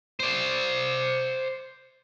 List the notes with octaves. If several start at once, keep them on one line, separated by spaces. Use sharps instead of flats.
C5 D5